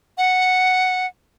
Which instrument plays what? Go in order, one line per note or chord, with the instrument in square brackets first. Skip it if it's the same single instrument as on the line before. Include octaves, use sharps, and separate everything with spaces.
[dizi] F#5